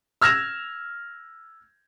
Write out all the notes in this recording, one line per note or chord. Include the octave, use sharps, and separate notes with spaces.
E6 F6 G#6 A#6 E7